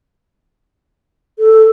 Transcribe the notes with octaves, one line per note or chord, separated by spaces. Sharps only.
A4